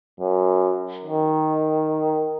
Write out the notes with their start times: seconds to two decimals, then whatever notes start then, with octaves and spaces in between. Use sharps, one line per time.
0.20 F#2
1.04 D#3